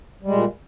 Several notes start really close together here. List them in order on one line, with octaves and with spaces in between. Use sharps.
G3 G#3 A#2